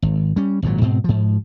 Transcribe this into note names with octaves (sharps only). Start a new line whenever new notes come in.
G#1
G3 C#4
G#1 G2 A#2 F#3
G#2 B2 C4
G#2 F3